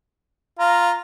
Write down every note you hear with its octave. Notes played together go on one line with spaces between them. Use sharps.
F4 A#5